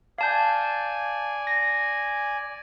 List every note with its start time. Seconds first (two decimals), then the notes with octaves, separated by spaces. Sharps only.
0.18 D5 F5 G#5 A5 G6
1.47 A#6